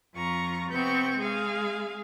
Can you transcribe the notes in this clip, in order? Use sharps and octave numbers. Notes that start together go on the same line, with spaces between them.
F2 F4 A#5 C#6
C3 B3 C4 C#6 G6
G#3 G#4 F5